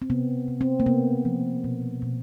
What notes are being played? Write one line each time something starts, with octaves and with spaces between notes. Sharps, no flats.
C4
C3 B3
C3
C4
A#3
C3 B3
F3
B2
B2